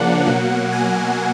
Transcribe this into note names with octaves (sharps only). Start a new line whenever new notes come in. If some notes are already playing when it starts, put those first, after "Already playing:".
Already playing: C#3 F3 A#3 D4 F#5
B2 F#3 A#3
G#5